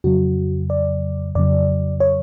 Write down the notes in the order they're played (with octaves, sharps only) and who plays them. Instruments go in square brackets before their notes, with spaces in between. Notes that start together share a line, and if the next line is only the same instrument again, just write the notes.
[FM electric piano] F2 C#3 F#3 F#4
D5
F2 C#3 F#3 D5
C#5